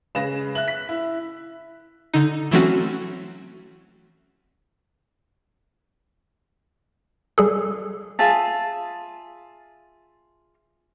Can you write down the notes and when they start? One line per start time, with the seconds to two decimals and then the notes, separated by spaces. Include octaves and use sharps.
0.15 C#3 G#3 B4 F5 A#6 E7
0.55 E5 F#6 F#7
0.68 B6
0.89 E4
2.14 D3 D#4
2.51 E3 F#3 A3 C4 C#4 F#4
7.38 G3 G#4 A4
8.19 F4 G#4 E5 A5